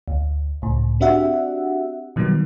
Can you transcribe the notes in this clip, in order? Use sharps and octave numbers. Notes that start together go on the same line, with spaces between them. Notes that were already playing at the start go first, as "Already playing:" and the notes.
D2
C#2 A2
C4 D4 F#4 G4 E5 F#5
B2 D#3 F#3 G3 B3